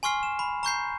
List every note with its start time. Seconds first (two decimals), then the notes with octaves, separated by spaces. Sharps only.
0.03 G#5 C6 C#6 F6 C7
0.23 E7
0.39 B5
0.63 A#5 C#6 G6 C7